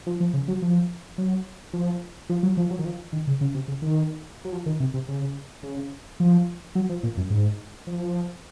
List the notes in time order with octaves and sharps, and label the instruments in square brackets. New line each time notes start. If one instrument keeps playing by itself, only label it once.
[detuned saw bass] F3
F3
C#3
F#3
F3
F#3
F3
F3
F#3
F3
F#3
D#3
F3
D#3
C#3
C#3
C3
C#3
D#3
F#3
F3
D#3
C3
C3
C#3
C#3
F3
F#3
F3
A#2
F#2
G#2
F3